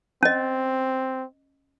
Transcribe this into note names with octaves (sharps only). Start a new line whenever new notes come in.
C4 C#4 D#5